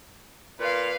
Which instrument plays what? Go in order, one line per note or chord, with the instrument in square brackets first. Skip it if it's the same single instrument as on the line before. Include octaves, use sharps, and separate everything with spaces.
[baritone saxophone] A#2 [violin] B4 F5